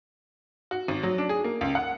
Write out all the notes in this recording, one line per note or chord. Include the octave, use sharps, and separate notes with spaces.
F#4
G#1
F#3
D4
G#4
A#3
C#2
F#5